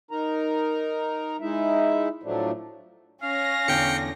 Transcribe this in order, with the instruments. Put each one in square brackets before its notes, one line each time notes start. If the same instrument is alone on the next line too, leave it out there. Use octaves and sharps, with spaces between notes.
[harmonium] D#4 A#4 A#5
G#3 D#4 E4 E5
A2 F3 F#3 A3 D4
[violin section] C#4 A#6 [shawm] F5
[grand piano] E2 D3 [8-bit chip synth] G5 C#7